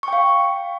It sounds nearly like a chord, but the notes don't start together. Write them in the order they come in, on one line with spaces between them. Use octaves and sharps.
C#6 G5 F5